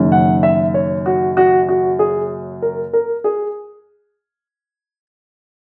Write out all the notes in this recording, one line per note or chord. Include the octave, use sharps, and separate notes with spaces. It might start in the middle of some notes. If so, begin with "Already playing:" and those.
Already playing: F#1 F#2 D#3
F#5
E5
C#5
F#4
F#4
F#4
G#4
A#4
A#4
G#4